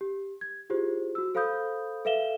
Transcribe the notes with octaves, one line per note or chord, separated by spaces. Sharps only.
G4
G#6
E4 F4 G4 G#4 C5
F#4 E6
A4 C5 F5 B5 D#6 G6
A4 B4 E5 F5 E7 G7